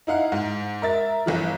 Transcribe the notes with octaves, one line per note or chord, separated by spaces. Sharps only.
D#4 E4 F5 F#5
G#2
A#4 E5 A6
G1 E3 F3